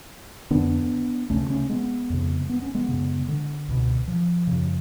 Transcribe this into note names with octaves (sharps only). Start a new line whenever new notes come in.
F2 D3 B3 D4
D2 C#3 A3 C#4
A3 C#4
G#3 B3
F2 C#3
B3
C#4
G#3 B3
F#2 C#3
D3
C#2 B2
F3
F#2 C#3